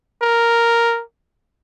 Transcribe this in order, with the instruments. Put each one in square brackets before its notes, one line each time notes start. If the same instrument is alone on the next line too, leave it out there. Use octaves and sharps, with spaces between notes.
[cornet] A#4